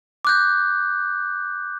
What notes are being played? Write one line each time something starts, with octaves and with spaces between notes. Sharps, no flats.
D6 F#6 G6